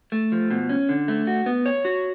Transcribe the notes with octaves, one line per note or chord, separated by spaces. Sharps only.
A3
F3
B2
C#4
D3
A3
F#4
B3
C#5
F#4